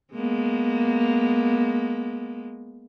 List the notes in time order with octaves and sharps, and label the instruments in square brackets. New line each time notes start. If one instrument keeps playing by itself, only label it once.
[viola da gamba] G#3 A#3 B3